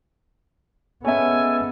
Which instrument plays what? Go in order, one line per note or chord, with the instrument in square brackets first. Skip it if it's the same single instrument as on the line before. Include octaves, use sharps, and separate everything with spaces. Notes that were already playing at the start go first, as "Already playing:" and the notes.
[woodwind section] G#3 C#4 A4 [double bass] B3 [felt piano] C#5 E5 [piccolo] G#5